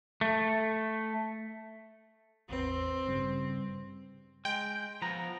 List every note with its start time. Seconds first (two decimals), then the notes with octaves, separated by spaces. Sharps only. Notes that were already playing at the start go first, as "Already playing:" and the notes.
0.21 A3
2.49 A1 E2 C4 B4
3.07 G2 C#3 G3
4.45 G#3 G5
5.02 F3 B3 A#5